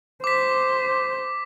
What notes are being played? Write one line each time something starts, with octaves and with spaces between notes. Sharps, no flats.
C5 D6 B6